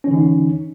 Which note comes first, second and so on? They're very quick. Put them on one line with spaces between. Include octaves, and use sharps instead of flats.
C#4 E3 D3 D#4